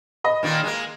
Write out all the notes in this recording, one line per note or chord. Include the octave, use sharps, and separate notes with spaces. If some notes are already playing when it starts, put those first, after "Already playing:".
D#5 B5
A#2 D#3 A#3
G#3 A#3